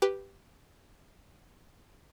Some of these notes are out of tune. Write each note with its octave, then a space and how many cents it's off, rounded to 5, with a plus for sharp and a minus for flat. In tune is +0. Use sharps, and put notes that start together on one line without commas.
G4 +0 B4 +0